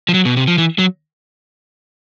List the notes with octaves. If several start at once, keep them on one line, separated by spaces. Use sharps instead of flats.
F3
F#3
B2
C3
F3
E3
F#3